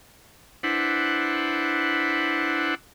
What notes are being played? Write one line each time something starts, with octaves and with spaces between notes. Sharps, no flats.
D4 E4 B4 C5 F#5